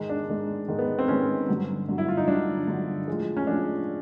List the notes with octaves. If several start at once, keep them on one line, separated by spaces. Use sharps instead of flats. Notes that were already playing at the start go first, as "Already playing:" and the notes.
Already playing: G#2 D#3 G#3
D4
G#2 D#3 G#3
G#2 D#3 G#3
B3
C4
G#2 D#3 G#3 C#4
G2 D3 F#3
G2 D3 F#3
E4
F4
D#4
G2 D3 F#3 D4
G2 D3 F#3
A2 F3 G#3
C#4
A2 F3 G#3 D4